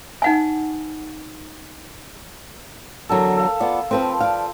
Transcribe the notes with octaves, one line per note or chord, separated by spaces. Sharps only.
D#4 F#5 G#5
E2 D3 F#3 A4 A#4 A#5
A4 F5
B3 F4 D5
F3 C4 B4 C5 G5 C6
D5 F5